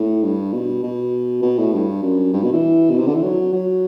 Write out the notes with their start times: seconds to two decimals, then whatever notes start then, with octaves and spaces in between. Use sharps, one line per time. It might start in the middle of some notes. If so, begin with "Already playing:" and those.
Already playing: A2
0.23 G2
0.53 B2
0.84 B2
1.43 B2
1.59 A2
1.73 G2
2.02 F#2
2.33 G2
2.43 B2
2.53 E3
2.91 B2
2.99 C3
3.08 D3
3.14 E3
3.23 F#3
3.53 F#3